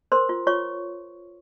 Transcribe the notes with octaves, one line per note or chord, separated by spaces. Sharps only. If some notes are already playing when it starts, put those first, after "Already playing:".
A#4 C5 C6
F4
F4 C#5 C#6